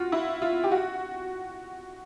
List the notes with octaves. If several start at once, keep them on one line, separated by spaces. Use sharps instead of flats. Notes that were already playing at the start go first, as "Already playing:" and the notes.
Already playing: F4 F#4
E4
F4
G4
F#4